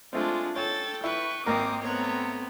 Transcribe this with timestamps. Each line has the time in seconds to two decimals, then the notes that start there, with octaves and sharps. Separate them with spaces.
0.13 G#3 A3 C4 D4 F4
0.56 A4 C#5 G5 A6
1.04 E4 B4 C#6
1.46 G#1 A#3 C4 A#4 D6 D#6
1.83 A3 B3 C4 C#5 A#5